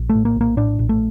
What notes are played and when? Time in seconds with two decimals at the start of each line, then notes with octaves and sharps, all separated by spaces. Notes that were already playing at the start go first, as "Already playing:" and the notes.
Already playing: A#1
0.10 A3
0.15 A2
0.25 A#3
0.36 A#1 A#3
0.57 A2 D4
0.79 A#1
0.89 A3